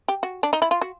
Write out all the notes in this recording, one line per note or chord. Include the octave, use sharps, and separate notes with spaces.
G4
F#4
D4
D#4
E4
F4
F#4